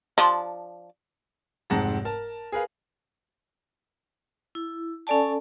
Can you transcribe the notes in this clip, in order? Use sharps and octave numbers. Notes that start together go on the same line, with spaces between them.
F3 D4
F1 G#2 C4 F#5 A5 A#6
A#4 A5
G#4 A#4 B4 F5
E4
C#4 A4 D5 G#5 A5